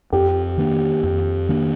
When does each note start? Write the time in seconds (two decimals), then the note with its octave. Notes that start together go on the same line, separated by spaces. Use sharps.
0.12 F2 G4
0.58 D#3 A#3 D4
1.03 F2
1.49 D#3 A#3 D4